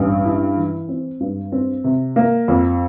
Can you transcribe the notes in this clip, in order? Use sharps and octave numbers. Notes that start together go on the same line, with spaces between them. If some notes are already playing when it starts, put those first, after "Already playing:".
Already playing: A1 G2
E4
E3
C4
G2
C4
C3
A#3
F2